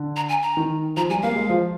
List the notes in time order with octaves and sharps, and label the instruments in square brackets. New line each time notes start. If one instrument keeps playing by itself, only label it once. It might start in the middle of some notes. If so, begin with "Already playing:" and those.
Already playing: [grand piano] D3
[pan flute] A#5
G#5
A#5
[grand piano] D#3
[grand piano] F3 [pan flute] A#5
[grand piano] G3 [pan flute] G#5
[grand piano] A#3 [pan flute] F5
[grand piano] G#3
F3